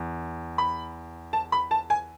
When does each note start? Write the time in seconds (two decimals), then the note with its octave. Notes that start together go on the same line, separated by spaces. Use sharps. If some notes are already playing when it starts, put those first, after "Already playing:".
Already playing: E2
0.58 B5
1.33 A5
1.52 B5
1.71 A5
1.90 G#5